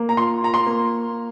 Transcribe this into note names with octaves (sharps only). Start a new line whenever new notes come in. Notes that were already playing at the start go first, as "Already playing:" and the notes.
Already playing: A#3
A#5
F4 C6
F4 A#5
C6
A#3